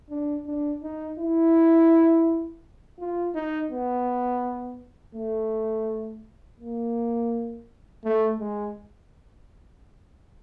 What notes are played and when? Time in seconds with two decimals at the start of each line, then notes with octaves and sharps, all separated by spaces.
0.11 D4
0.47 D4
0.83 D#4
1.19 E4
3.00 F4
3.35 D#4
3.72 B3
5.15 A3
6.60 A#3
8.04 A3
8.40 G#3